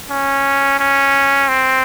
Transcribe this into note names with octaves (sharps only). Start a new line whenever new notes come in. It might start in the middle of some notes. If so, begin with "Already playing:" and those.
C#4
C#4
C4